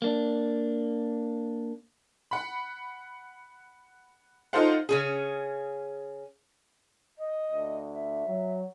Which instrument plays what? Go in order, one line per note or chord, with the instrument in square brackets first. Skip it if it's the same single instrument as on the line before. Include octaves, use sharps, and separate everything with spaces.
[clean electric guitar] A#3 D4
[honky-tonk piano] F#5 B5
D#4 F4 A4 C5 F5 F#5
[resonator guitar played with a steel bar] C#3 C#4 G#4
[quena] D#5
[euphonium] D2
[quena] E5
[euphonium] F#3